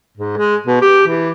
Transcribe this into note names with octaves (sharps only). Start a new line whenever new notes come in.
G#2
G#3
B2
G4
E3